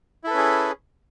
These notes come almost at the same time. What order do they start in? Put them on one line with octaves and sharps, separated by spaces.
E4 A4 B4 C#4 G#4